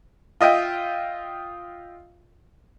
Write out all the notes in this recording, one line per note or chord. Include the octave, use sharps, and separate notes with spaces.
F4 D#5 E5 G5